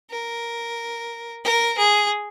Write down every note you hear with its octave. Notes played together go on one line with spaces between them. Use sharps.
A#4
A#4
G#4